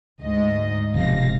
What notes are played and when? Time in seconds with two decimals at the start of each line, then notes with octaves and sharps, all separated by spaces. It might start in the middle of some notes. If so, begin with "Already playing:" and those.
0.21 D2 G#2 D#5
0.94 E1 G#2 C3 F3 F5 A#6